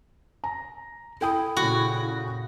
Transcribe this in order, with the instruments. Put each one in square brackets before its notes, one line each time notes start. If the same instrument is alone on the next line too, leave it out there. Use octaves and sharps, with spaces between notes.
[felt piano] A#5
[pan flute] E4 [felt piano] A4 G5 D#6
[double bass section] A#2 C#3 [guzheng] F#4